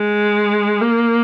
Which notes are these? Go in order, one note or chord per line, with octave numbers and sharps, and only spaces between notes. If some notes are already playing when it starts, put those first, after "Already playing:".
Already playing: G#3
A#3